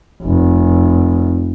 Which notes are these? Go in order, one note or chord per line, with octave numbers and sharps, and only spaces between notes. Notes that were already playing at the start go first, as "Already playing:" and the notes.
F1